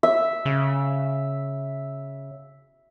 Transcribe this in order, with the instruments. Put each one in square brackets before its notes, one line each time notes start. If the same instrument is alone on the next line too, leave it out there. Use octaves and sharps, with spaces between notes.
[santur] E5
[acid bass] C#3